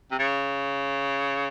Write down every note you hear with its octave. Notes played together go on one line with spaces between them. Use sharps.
C3
C#3